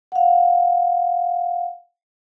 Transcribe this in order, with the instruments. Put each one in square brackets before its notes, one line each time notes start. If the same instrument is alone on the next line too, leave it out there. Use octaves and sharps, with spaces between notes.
[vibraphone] F5 F#5